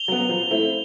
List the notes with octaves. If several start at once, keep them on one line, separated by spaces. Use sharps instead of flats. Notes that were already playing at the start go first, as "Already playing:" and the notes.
Already playing: F7 G7
F#3 B3
F3
A3 C4 E4